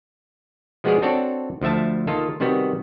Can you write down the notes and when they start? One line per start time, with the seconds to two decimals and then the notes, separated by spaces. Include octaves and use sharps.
0.84 F3 G#3 B3 F#4 G#4 D5
1.02 C4 D4 F#4 A4 C#5 D5
1.61 D2 F3 A3 E5 A5
2.07 D#3 A#3 F4 A4
2.40 C3 D#3 G3 B3 F#4